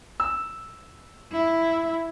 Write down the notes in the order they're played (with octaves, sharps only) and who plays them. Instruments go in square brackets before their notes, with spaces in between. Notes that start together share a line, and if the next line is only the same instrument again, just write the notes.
[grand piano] E6
[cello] E4